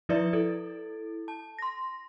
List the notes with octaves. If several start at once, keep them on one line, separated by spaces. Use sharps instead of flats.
F3 E4 B4 D5 E5
E4 A4
A5
C6 A#6